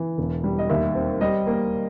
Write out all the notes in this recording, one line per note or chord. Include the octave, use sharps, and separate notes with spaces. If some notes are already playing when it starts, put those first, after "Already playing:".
Already playing: E3
E1
G3
D#5
D#2 E5
C4
G3 D#5
A#3